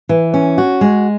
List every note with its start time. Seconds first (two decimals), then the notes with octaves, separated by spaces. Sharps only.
0.09 E3
0.34 C#4
0.58 F#4
0.81 G#3